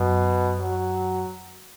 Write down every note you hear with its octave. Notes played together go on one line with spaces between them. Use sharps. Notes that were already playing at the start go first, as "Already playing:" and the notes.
Already playing: F#2 B2
F#3